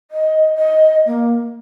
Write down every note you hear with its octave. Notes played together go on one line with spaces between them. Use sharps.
D#5
D#5
A#3